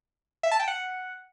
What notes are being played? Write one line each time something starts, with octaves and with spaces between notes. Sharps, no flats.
E5
A5
G5
F#5